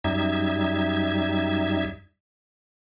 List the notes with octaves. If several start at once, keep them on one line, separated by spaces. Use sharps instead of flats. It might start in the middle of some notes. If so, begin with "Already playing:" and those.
F#2 G3 D#4 E5 G#6